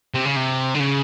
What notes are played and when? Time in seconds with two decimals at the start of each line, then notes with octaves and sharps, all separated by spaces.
0.14 C3
0.25 C#3
0.36 C3
0.74 D3
0.80 C#3